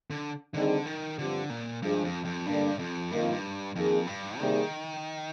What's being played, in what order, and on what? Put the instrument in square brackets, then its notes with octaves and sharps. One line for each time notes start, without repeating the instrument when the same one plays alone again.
[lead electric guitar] D3
[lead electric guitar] D3 [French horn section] D#3 G3 C4 D#4 G#4
[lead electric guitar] D#3
[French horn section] G2 F3 C4 G4 [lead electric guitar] D3
[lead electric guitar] A#2
[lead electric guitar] G2 [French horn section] F3 G#3 D4 G#4
[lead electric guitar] F2
F2
[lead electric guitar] G2 [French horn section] D3 G3 A#3 D4
[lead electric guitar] F2
[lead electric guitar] G2 [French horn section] D#3 A#3 F4
[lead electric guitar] F2
G2
[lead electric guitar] F2 [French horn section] D#3 A#3 D#4 G#4
[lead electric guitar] G2
[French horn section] C3 G3 A#3 D#4 G#4 [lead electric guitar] D#3